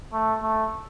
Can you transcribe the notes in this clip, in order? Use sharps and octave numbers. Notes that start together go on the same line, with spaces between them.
A3
A3